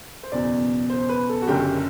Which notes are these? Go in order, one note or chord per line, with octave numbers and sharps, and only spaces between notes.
C5
F#1 E2 B2 D5
C5
B4
A4
F#4
F#1 F#2 D3 G4